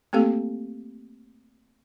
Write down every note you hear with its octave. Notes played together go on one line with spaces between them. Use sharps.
A3 A#3 C4 G4 A4 F5